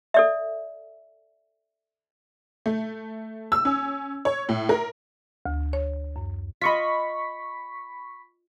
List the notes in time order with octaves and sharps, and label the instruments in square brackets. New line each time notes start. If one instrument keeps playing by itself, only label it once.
[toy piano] A4 D5 E5
[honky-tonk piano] A3
E6
C#4
C#5
A2
A#4
[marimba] D2
C#5
F#2
[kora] F4 D#5 [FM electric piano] B5 C#6 B6